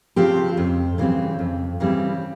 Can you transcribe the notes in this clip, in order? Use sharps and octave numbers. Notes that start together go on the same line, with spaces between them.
C#3 F3 C4 G4
F2
C#3 E3 G3 C4
F2
C#3 E3 G3 C4